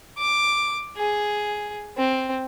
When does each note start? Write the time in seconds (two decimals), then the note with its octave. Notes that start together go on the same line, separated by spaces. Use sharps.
0.18 D6
0.97 G#4
1.98 C4